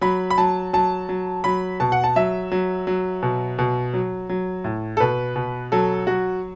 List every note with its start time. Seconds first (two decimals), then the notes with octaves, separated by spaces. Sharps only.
0.01 F#3 B5
0.30 B5
0.38 F#3 A5
0.73 F#3 A5
1.09 F#3
1.44 F#3 B5
1.80 B2 A5
1.92 F#5
2.04 A5
2.16 F#3 E5
2.51 F#3
2.87 F#3
3.23 B2
3.59 B2
3.94 F#3
4.29 F#3
4.64 A2
4.97 A4
5.00 B2 B4
5.36 B2
5.72 F#3 A4
6.07 F#3 F#4